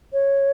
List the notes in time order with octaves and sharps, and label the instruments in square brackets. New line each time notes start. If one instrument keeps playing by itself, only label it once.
[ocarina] C#5